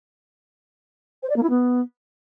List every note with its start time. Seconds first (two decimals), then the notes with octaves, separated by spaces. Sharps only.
1.23 C5
1.29 D5
1.36 A#3
1.43 E4
1.50 B3